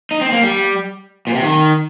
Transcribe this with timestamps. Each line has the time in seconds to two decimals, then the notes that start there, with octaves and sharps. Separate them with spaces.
0.11 D#4
0.21 C4
0.32 A#3
0.43 G3
1.27 A#2
1.35 C3
1.43 D#3